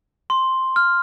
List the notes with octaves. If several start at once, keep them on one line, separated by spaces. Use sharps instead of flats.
C6
F6